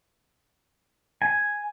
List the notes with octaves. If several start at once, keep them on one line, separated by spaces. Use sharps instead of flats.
G#5